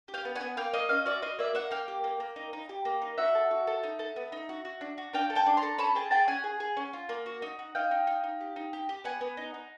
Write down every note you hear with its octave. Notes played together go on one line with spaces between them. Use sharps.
G4
F5 G5
B3
F#5 G#5
B3
A#3 F5 G5
A#3 D#5 F5
C#4 D#5 F5
F#4 D5 E5
F#4 D#5 F5
A#3 D5 E5
A#3 E5 F#5
A#3 F5 G5
G4
A#3
A#3
D#4
D#4
G4
A#3
D#4
F#4 E5 F#5
A4
F#4
A4
D#4
A4
B3
D#4
F#4
F#4
D4
F#4
D4 F5 G5
A4
G5 A5
D4
A#5 C6
A4
C#4 A5 B5
G#4 G5 A5
G#4 G5 A5
C#4 F#5 G#5
G#4
G#4
C#4
F4
A#3
F#4
D#4
F#4
D#4 F5 G5
D#4
D#4
D#4
G4
D#4
G4
G4
B3 F#5 G#5
B3
D#4
D#4